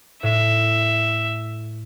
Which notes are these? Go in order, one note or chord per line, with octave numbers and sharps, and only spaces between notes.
A2 E5